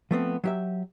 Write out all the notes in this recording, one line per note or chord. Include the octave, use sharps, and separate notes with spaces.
F3 A3 B3 C4
F#3 G4 E5